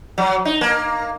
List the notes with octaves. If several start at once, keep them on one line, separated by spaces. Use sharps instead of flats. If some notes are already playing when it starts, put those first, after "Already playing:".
F#3
D#4
A#3